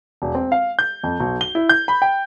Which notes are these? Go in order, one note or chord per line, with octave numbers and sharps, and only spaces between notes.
E1
C4
F5
G6
F2
B1
G7
E4
G6
B5
G5